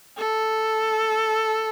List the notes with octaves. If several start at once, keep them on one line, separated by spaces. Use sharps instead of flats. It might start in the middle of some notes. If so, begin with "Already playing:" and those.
A4